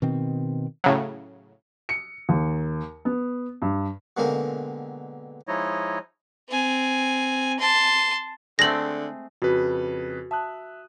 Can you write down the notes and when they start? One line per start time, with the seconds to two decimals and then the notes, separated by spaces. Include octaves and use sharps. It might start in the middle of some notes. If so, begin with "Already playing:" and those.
0.02 B2 D#3 C4
0.84 A2 C#3 F#3
1.89 C#7
2.29 D#2
3.05 B3
3.62 G2
4.17 B2 D3 G#3 A#3 C4 A#4
5.47 F3 G#3 D#4 E4 C#5 D#5
6.49 C4 G#5
7.60 A5 C6
8.59 D3 G#3 A3 C4 A#6 F#7
9.42 F2 C#3 F#4 B4
10.31 E5 A5 D#6 F#6